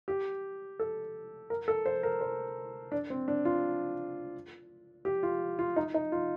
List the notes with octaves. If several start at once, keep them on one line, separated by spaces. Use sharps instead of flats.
G4
A4
A#4
A4
C5
A#4
C5
D4
C4
D4
F4
G4
F4
F4
D#4
D#4
F4